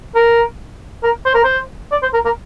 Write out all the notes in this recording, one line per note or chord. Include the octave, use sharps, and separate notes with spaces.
A#4
A#4
C5
A#4
C5
D5
C5
A#4
A#4